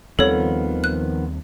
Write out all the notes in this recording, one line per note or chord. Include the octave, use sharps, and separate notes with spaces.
D#2 D#3 F3 G3 B3 C4 A4 C#5
F#6